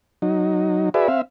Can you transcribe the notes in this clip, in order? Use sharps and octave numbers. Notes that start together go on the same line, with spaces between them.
F#3 D#4
F#4 G#4 B4 D5 E5
C4 E5 F5